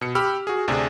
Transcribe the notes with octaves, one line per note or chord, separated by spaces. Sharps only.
B2 C#7
G4 B5 E6 F6
F#4 G#4
D2 C3 D4 G#4